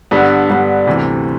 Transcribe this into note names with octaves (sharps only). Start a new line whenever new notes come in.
G2 D3 G3 B3
G2 D3 G3 B3
D2 C3 E3